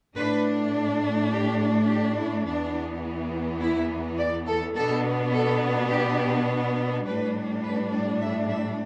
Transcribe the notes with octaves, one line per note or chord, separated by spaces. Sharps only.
A2 A3 D4 B4
G4
G4
E4
E2 E3 B3 D4
E4
D5
A4
B2 B3 D4 A4
A4
G4
A2 G3 D4 B4
B4
D5
E5
E5